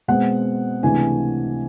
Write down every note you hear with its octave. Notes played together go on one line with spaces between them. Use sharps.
B2 G#3 C4 F#5
C#2 C3 E3 A3 D4 G#5